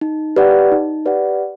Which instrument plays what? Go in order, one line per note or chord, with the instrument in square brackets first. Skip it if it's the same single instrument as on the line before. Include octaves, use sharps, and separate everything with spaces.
[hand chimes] D#4
G4 B4 D5 F#5
D#4
G4 B4 D5 F#5